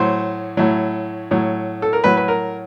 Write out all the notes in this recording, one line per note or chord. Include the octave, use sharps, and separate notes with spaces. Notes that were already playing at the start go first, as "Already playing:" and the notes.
Already playing: A2 F#3 C5
A2 F#3
A2 F#3
A4
A#4
A2 F#3 B4
B4
A#4